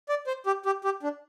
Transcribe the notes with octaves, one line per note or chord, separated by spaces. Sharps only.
D5
C5
G4
G4
G4
D4